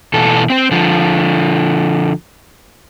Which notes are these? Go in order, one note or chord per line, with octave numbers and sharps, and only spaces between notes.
B2 E3 A4
C4 C5
D3 F3